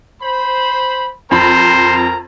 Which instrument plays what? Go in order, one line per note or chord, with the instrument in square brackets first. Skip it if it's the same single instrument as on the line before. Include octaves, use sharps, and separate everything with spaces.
[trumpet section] C5 B5
[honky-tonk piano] F2 B5 [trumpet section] C4 A#4 A#5 [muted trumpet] C5